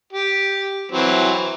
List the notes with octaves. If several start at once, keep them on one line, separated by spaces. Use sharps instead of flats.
G4
E3 F#3 C4